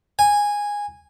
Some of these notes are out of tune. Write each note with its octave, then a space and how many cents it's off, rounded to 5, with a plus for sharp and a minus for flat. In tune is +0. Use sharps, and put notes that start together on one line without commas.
G#5 -10